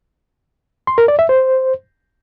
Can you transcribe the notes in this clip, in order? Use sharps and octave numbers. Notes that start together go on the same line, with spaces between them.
C6
A#4
D5
E5
C5